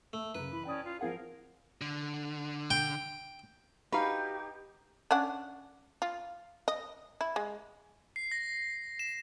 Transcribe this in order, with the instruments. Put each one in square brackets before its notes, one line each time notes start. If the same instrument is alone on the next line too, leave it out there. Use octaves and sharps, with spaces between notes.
[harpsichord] A3
[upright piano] F#2 C#3 [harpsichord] B4
[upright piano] E3 [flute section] B5
[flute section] C#4 D5 [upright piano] G5 A5 D#6
[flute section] F4
[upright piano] F3 C4 F#5 [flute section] G#4 A#4 F5
[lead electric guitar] D3
[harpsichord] G5
[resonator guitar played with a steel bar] D#4 [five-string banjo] F#4 F5 [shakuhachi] G4 [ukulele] B4
[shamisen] C#4 D4 F#5
F4
D#5
E4
G#3
[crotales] C7
A#6
E7